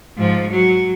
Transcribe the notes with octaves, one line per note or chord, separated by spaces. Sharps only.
G#2 F3
F#3